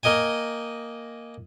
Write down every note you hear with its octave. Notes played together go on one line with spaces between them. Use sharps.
A#3 A#4 D#5 G5 G#5